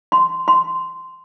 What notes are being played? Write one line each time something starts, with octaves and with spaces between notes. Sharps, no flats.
C6
C6